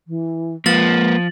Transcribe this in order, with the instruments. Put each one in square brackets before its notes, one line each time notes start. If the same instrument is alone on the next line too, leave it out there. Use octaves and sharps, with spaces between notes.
[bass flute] E3
[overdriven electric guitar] F3 [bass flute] G#3 [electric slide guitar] A#3 B4 [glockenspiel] A6 F#7